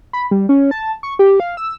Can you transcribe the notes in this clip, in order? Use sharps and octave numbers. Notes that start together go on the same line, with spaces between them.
B5
G3
C#4
A5
C#6
G4
F5
E6